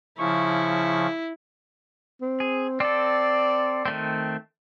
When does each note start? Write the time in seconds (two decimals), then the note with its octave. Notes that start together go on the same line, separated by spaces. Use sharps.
0.18 C#3 F3 E4 C#6
2.21 C4
2.40 G#4
2.80 C4 A4 D5
3.86 D#3 A3 C4